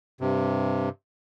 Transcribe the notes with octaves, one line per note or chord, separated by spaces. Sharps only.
G2 C3